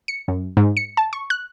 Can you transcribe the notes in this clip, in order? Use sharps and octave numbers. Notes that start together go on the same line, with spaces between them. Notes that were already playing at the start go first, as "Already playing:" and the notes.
C#7
F#2
G#2
C#7
A5
C#6
F#6